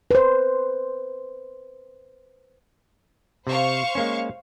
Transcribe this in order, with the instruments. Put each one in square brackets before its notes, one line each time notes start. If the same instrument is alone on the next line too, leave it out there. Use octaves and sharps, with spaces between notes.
[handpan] B4 C5
[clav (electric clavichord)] C3 [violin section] C5 F5 C#6
[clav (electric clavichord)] G#3 A#3 C#4